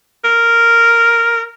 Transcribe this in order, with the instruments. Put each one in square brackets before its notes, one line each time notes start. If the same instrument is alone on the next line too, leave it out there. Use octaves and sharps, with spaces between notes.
[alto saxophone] A#4